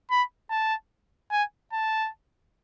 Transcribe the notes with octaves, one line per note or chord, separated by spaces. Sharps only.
B5
A5
G#5
A5